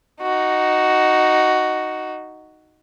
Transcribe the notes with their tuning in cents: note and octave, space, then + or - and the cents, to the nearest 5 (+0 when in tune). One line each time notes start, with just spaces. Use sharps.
D#4 +0 F#4 +5